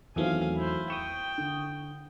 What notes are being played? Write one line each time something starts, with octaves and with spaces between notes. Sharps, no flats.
E2 D#3 E3 F#3 A3 C4 F5 G#5
E4 C5
G5 C#6 D#6 E7
D3